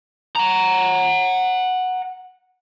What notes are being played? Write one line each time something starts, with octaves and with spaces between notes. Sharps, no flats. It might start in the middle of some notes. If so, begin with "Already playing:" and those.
F#5 A#5